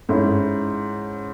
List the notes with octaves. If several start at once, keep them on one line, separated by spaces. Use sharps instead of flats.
G#2 G#3 C#4 E4